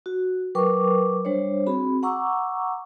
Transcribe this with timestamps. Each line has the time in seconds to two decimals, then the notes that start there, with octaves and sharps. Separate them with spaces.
0.06 F#4
0.55 F#3 A#4 B4 G5 C#6 D6
1.25 G3 D4 C5 C#5
1.67 C4 F#4 G#4 B5
2.03 F#5 A#5 C#6 D6 E6